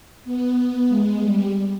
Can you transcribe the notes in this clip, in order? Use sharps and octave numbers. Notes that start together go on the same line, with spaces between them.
B3
G#3
G3